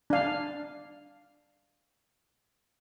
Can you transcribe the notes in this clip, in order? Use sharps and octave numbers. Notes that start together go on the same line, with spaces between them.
D4 F5